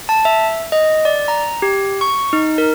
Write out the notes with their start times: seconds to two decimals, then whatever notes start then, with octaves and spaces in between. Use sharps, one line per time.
0.09 A5
0.25 E5
0.72 D#5
1.05 D5
1.28 A#5
1.62 G4
2.01 C#6
2.33 D#4
2.58 A#4